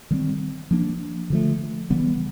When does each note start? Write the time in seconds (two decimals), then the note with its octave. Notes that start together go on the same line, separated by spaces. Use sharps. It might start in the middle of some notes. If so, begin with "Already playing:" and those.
0.11 D#3 G3 C4
0.71 F3 A#3 D4
1.30 D3 F3 A3
1.90 C#3 E3 G3 B3